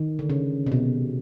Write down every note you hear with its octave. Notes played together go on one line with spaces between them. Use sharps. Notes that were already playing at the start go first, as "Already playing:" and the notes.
Already playing: D#3
D3
C#3
C3
B2